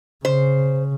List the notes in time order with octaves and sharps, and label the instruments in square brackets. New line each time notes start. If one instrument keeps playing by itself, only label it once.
[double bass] C#3 [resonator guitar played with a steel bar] C5